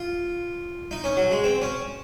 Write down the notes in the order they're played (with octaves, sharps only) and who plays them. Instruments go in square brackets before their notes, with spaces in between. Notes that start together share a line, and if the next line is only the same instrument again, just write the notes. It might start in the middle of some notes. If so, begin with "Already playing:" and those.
Already playing: [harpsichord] F4
D#4
C#4
F#3
G#3
C4
C#4